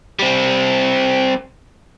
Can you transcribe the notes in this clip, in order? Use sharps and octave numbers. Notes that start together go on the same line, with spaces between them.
G3 C4